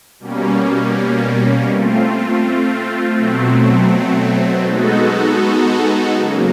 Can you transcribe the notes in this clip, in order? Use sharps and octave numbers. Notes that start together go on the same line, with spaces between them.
B2 G3 A#3 C#4
A3 C4 F4
B2 F#3 A3 C4
G#3 B3 D#4 F#4 A4
C#3 F#3 A#3